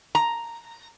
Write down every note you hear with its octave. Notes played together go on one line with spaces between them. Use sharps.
A#5